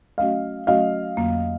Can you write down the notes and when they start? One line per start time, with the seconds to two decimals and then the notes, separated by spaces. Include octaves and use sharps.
0.18 F#3 A3 C#4 F#4 D#5 F5
0.67 F#3 A3 C#4 F#4 D#5 F5
1.17 F2 D3 F#3 A#3